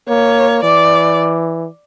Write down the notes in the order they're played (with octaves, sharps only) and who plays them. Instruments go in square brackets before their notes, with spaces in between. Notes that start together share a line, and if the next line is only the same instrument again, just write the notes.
[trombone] A#3 [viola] C#5
[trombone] E3 [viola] D5